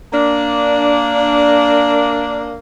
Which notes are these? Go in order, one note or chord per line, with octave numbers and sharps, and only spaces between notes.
A#3 D4